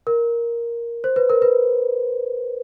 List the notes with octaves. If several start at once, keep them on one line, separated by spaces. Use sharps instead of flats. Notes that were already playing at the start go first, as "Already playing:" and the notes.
A#4
C5
B4
A#4
B4